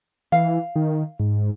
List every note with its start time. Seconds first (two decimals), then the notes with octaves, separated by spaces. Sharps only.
0.32 E3 F5
0.76 D#3
1.19 G#2